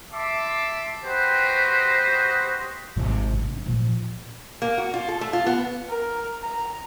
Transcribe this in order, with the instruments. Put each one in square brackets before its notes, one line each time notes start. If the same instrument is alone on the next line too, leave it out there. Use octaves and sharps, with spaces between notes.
[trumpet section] E5 A5 C6 D6
F#4 G4 B4 C5 D#5
[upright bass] G#1 C3
G2 C4
A#2 F3
[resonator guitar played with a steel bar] A#3
F#4
F4
A4
A3
F4
B3
[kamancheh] A#4
A#5